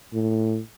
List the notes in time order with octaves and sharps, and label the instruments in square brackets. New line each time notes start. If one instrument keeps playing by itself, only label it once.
[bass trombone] A2